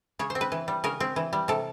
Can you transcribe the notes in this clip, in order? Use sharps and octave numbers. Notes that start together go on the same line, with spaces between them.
C#3 C#5
C5
C4
B4
E3
G3
C#3 A#4
C4
E3
G3
C3 A4